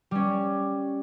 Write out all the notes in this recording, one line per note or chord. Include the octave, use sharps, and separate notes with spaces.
G3 C#4